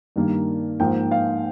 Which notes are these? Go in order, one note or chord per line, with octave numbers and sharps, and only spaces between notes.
G2 D#3 G3 A#3
G#2 F3 A#3 G5
F5